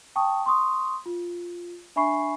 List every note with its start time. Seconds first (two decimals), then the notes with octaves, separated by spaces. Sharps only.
0.16 G5 A5 C#6 D#6
0.46 C6 C#6 D#6
1.06 F4
1.96 D4 E5 G#5 B5 C#6 C7